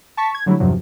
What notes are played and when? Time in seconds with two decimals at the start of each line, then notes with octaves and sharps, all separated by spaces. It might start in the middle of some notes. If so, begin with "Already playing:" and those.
0.17 A5 C#6 B6
0.35 G#6
0.46 D3 F#3 G3 A3 E4
0.60 E2 G2 C3 F3 F#3